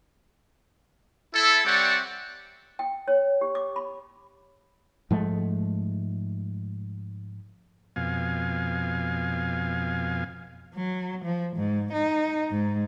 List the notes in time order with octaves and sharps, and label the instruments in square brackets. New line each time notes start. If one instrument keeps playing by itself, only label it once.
[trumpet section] E4 A4
G3 C4 C#5 D5 E5 F#5
[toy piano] G5
C#5
G4
D6
B5
[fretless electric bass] G#2 F3 G#3 A3
[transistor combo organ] F2 B2 F5 G#5
[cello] F#3
F3
G#2
D#4
G#2